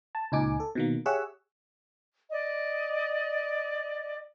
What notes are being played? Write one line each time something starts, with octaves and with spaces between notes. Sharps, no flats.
A5
C#2 A#2 D#4 G#5 D6
A4
B2 D#3 A#3
G4 G#4 C#5 E5 F#5 E6
D5 D#5